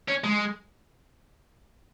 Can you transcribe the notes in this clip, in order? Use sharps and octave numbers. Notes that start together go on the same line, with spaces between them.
C#4
G#3